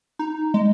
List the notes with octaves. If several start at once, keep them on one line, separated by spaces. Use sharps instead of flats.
D#4
G#3